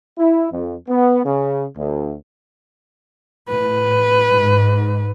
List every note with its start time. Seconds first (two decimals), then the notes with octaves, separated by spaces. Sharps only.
0.18 E4
0.52 F2
0.89 B3
1.25 C#3
1.78 D2
3.49 A2 B4
4.29 G#2